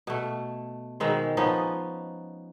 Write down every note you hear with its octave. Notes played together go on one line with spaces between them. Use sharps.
B2 A3
B2 D#3 G#3 C4
F3 B3 C#4 D#4